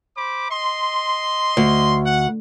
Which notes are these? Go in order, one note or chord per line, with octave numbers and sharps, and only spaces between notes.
C5 B5 D6
D#5 C6
D2
F#5